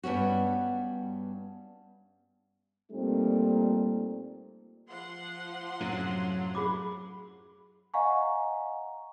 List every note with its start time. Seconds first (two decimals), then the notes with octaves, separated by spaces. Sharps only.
0.03 G2 B3 C#4 F#4
2.92 A#2 G3 A3 C4 D#4
4.90 F3 F#5 C6
5.81 F#2 A2 C3 F#3
6.55 G#4 B5 D6
7.94 D#5 F5 F#5 G#5 A#5 C#6